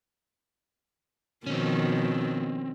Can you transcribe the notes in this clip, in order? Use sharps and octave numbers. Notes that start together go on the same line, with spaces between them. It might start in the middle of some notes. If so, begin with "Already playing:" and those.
B2 D#3 F3 C4 C#4